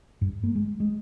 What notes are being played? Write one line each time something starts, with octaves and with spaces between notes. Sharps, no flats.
G2
A#3
G#3
G#3